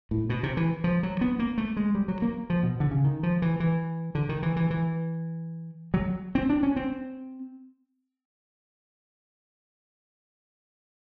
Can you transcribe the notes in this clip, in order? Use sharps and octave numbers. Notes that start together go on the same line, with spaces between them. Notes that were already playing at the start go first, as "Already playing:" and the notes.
A2
B2
C3
E3
F3
F#3
B3
A#3
A3
G#3
G3
F#3
A#3
F3
B2
D3
C#3
D#3
F3
E3
E3
D3
D#3
E3
E3
E3
F#3
C4
D4
C#4
C4